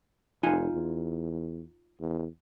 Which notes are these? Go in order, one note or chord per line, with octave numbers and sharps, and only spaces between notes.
F1 D#4 F4 G#5
E2
E2